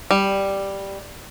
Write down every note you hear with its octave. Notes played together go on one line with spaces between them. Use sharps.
G3